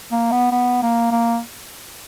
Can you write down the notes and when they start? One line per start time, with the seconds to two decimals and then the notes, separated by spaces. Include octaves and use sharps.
0.12 A#3
0.32 B3
0.52 B3
0.83 A#3
1.12 A#3